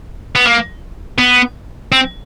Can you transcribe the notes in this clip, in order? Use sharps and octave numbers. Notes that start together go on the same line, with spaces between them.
B3
A#3
B3
C4